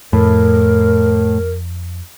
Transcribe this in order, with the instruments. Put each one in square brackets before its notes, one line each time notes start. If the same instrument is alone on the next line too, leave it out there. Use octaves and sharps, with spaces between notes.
[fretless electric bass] F2 [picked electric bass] A2 [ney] A#4